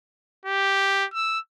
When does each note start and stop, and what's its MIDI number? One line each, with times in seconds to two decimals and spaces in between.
0.46 1.05 67
1.14 1.39 88